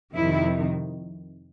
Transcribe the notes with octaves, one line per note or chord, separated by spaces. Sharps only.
F2 C3 D#3 E4